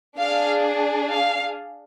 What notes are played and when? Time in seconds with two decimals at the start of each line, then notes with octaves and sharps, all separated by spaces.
0.18 D4 G#4 F5
1.13 F5